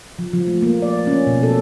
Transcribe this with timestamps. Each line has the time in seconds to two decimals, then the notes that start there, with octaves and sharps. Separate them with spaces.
0.19 F3
0.33 F3
0.47 A3
0.62 A#3
0.82 D5
1.07 C#4
1.27 B2
1.43 A4